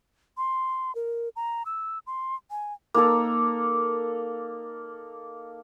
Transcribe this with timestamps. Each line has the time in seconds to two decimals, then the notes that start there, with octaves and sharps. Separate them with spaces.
0.37 C6
0.95 A#4
1.36 A#5
1.66 E6
2.07 C6
2.51 G#5
2.94 A#3 D#4 A4 A#4